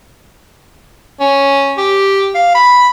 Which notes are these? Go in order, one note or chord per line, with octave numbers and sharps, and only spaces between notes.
C#4
G4
F5
B5